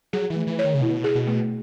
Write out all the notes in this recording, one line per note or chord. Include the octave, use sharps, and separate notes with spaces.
F#3 G#4
E3
A3
E3
C#5
D#3
C#3
B2 E4
G#4
B2
A3